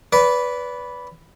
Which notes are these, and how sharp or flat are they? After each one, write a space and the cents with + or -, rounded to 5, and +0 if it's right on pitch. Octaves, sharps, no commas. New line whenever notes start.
B4 +0 D5 -25